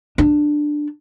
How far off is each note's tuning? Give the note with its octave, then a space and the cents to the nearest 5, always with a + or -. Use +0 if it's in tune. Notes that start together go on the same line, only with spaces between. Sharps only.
D4 +10